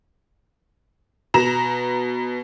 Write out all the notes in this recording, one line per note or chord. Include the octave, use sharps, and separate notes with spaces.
B2 A#5 E7